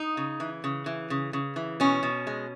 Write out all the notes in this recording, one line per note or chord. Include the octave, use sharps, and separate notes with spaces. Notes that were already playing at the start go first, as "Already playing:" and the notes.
Already playing: D#4
C#3
E3
C#3
E3
C#3
C#3
E3
B2 C#4
B2
G#3